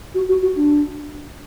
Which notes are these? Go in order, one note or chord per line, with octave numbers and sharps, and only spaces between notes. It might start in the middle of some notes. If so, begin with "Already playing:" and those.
F#4
F#4
F#4
D4